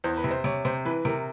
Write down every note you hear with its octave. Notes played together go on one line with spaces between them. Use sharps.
E2 C5
B4
C3
C5
C3 C#5
C3 C5
E3 B4
C3 A#4